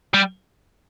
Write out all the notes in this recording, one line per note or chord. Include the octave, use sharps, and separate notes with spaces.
G3